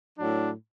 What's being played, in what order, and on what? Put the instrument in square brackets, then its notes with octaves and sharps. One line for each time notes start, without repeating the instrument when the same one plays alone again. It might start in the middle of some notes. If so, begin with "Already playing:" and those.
[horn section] A2 F#3 D4